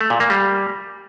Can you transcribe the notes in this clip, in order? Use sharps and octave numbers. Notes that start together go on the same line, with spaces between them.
A3
A#2
A#3
G3